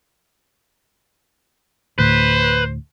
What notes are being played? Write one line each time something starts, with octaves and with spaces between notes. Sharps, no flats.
D2 A2 B4 C5